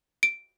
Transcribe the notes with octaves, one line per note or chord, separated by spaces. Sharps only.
D7